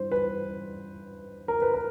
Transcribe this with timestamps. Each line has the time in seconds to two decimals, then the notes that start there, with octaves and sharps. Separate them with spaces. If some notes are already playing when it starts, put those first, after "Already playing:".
Already playing: G2 E3 C5
0.12 B4
1.48 A#4
1.62 B4
1.74 A#4